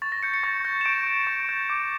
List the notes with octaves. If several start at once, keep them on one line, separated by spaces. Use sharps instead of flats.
C#6 A6
A#6
G6 C#7
C#7
C#6 A6
G6 A#6
E7
C#6 D7
G6
C#6
G6
D6